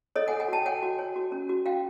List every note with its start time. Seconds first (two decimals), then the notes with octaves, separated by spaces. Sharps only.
0.16 A4 C#5 D#5
0.28 F#5 G#5
0.33 A4
0.40 F#5 G#5
0.48 F#4 G5 A5
0.66 C#5 F#5 G#5
0.83 F#4
0.99 C#5
1.16 F#4
1.32 C#4
1.49 F#4
1.66 F#4 F5 G5